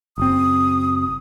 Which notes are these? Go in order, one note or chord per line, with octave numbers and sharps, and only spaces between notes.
F#1 C4 D#6